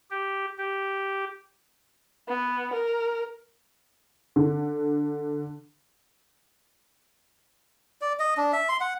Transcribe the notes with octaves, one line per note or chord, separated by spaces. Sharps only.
G4
G4
B3
A#4
D3
D5
D#5
D4
E5
C6
F#5